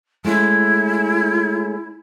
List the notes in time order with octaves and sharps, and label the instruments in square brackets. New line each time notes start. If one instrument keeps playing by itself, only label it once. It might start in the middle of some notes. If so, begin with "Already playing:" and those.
[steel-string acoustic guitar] G#3 A3 C#4 [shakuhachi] E4